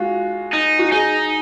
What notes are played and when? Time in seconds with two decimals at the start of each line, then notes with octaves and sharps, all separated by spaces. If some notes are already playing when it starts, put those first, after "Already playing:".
Already playing: G#3 F4 F#4
0.53 D#4
0.79 F#4
0.91 D#4 G#4